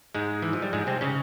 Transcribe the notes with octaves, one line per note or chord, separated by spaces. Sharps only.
G#2 G#3
E3
F3
G3
G#2 G#3
C3 C4
C#3 C#4